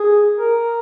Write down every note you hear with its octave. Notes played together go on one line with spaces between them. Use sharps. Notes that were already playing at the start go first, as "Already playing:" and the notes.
Already playing: G#4
A#4